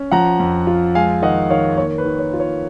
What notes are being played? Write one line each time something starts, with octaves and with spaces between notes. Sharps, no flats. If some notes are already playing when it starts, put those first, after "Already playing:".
Already playing: C#4
F3 F#5 A#5
F2
F4
G#3 F5 G#5
D#3 D#5 F#5
D#3 C#5 F5
A#3 C#5
B4
D#3
C#5
F4
C#5